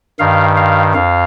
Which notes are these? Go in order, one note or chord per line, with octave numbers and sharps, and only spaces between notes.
G2 D#3 F5
F5
F2 F5